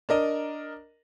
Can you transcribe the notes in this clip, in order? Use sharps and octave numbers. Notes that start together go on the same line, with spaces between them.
D4 A#4 D#5